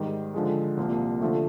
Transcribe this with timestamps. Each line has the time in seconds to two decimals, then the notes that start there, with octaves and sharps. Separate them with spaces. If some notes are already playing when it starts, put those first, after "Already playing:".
Already playing: G#2 D#3 G3
0.34 D3 F3 G#3
0.77 C2 A#2 F3 A#3
1.21 D3 F3 A3